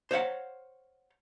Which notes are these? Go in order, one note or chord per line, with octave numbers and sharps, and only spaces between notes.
C5 C#5 F5 F#5